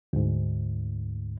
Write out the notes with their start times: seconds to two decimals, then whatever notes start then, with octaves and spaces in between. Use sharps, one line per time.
0.13 D2 G#2